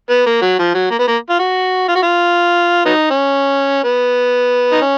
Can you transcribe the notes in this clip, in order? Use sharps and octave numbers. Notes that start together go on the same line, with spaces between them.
B3
A#3
F#3
F3
F#3
A#3
B3
A#3
F4
F#4
F4
F#4
F4
F#3 B3 D#4
C#4
B3
D#4
C#4